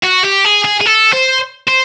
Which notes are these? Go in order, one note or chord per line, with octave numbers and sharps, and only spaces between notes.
F#4
G4
G#4
G#4
G#4
A4
C5
C5